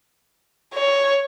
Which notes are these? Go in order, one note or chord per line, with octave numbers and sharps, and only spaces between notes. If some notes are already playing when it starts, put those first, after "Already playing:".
C#5